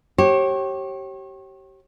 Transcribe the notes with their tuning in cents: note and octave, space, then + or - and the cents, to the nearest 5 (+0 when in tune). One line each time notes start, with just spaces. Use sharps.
G4 -25 C#5 -35